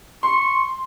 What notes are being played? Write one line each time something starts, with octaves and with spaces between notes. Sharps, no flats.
C6 C#6